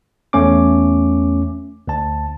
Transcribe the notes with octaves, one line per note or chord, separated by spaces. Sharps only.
E2 A3 C#4 D6
D2 A5